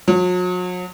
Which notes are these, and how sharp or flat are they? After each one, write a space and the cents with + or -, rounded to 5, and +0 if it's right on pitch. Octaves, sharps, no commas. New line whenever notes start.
F#3 -40